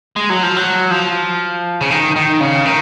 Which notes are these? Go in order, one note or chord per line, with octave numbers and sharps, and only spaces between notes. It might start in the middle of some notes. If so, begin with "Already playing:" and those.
G#3
F#3
F3
F#3
F3
C#3
D#3
D#3
C#3
D#3